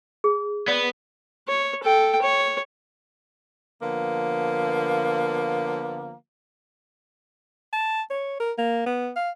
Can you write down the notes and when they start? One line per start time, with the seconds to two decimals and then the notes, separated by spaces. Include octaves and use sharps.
0.24 G#4
0.68 B3 D5
1.48 C#5
1.83 A4 G5
2.22 C#5
3.81 D3 F3 A#3 B3
7.73 A5
8.10 C#5
8.40 A#4
8.58 A#3
8.86 B3
9.16 F5